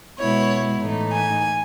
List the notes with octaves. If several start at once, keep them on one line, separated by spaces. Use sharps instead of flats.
B2 G#3 B3 E4 C#5
A2 E3 A3 D#4
G#5